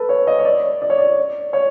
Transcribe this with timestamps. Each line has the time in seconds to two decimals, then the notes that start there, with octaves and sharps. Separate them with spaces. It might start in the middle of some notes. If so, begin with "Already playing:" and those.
Already playing: A4 B4
0.09 C#5
0.27 D#5
0.39 C#5
0.45 D5
0.82 D5
0.90 C#5
0.98 D5
1.53 C#5